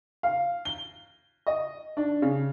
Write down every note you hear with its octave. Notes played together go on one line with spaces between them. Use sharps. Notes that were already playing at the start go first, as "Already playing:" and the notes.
F5
G7
D#5
D4
C#3